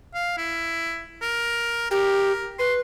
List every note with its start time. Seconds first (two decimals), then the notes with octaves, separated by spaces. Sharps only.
0.14 F5
0.38 E4
1.22 A#4
1.91 G4 A#4
2.59 B4 C6